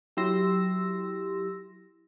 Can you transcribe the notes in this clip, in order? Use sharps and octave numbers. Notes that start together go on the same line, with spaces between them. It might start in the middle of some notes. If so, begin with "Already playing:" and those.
F#3 E4 G4 C6 E6 A#6